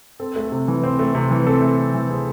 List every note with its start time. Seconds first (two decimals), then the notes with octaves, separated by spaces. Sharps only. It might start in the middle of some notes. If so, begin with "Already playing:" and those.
0.20 C4 A4
0.36 A3
0.52 C3
0.68 E3
0.83 C4
0.99 A3
1.15 C3
1.31 E3
1.47 C4 A4
1.62 A3
1.78 C3
1.94 E3
2.10 C4 G#4